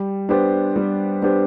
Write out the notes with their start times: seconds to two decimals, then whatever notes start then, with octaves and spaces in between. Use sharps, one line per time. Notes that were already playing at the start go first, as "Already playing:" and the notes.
Already playing: G3
0.29 B3 D4 G4 C5
0.76 G3
1.22 B3 D4 G4 C5